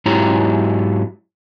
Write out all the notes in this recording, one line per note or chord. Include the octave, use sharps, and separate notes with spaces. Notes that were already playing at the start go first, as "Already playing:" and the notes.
G#2 F#3 E4 G4 C#5 A#5